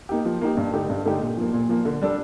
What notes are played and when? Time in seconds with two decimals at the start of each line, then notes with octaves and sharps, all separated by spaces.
0.09 A#3 D#4 G4
0.25 F3
0.41 A#3 D#4 G4
0.57 G2
0.73 D3 A3 D#4 G4
0.89 G2
1.05 D3 A3 D#4 G4
1.21 A#2
1.37 F3 A#3
1.53 A#2
1.69 F3 A#3
1.85 D3
2.01 G3 D4 A4